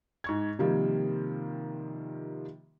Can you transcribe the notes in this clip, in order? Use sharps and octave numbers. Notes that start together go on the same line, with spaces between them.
G#2 C#6 G#6
C3 D#3 F3 G3 A#3